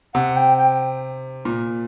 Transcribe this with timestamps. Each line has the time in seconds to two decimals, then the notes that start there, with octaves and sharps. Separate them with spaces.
0.14 C3 F#5
0.36 G5
0.58 G5
1.45 A#2